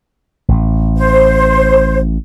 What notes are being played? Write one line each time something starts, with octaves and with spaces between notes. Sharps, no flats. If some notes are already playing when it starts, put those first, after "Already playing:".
A1
C5